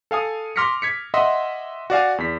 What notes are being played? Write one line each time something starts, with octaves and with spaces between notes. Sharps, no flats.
A4 F5 G#5 D#6
C6 D6 F6 A#6 B6 C#7
G#6 B6 C#7
D#5 E5 F#5 C6
F#4 D5 F5 G#5
E2 B6